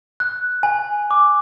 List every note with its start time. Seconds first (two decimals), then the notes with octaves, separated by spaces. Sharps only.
0.20 F#6
0.63 G#5
1.11 D6